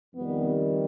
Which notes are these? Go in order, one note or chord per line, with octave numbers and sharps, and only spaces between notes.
F2 C3 D#3 G3 B3